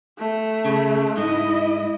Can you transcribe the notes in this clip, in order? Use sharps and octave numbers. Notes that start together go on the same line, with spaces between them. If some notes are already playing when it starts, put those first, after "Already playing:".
A3
C#3
G#2 E4 D#5